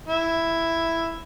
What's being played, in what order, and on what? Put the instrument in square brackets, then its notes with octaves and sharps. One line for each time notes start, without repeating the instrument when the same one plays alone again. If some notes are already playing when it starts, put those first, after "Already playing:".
[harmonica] E4